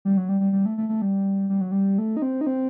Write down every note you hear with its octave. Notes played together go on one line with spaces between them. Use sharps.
G3
F#3
G3
G3
G3
A3
A3
A3
G3
G3
F#3
G3
A3
D#4
C4
D#4
C4